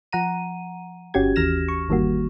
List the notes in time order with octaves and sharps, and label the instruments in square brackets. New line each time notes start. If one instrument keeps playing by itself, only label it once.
[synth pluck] F3 F#5 A#5 D#7
G1 C#4 F#4 G4 G#6
D#2 E3 F6 A#6 E7
C#6
G1 D#3 G3 A#3 F#4